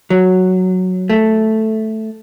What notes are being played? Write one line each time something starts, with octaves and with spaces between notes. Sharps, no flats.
F#3
A3